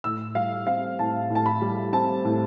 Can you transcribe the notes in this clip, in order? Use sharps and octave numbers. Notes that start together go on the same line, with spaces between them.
A2 E6
G3 F5
C4 F5
A2 A5
A2
A5
B5
G3
C4 A5
A2